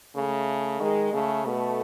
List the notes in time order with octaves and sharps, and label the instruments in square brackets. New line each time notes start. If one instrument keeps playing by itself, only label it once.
[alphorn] C#3 [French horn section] A3
[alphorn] D#3 [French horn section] G#3
[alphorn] C#3 [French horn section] A3
[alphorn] B2 [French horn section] A3